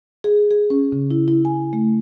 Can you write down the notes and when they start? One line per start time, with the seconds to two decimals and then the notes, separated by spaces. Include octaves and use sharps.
0.24 G#4
0.51 G#4
0.70 C#4
0.92 C#3
1.11 E4
1.28 E4
1.45 G#5
1.73 A3